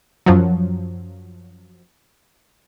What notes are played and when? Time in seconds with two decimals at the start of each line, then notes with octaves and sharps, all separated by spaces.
0.26 F#2 F3 F#3